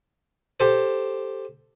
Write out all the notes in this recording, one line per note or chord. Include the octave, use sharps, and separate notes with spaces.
G4 A4 C5